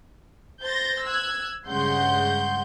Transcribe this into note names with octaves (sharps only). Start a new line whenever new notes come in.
C5 G6 A6 A#6
E6 F#6 G#6
G2 C#3 G#3 F#5 C6 G6